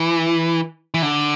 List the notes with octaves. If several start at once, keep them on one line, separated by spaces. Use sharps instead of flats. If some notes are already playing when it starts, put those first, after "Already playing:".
Already playing: E3
E3
D3